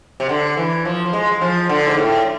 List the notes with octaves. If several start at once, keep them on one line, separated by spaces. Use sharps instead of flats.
C3
D3
E3
F3
F3
G#3
G#3
F3
D3
G#2
A2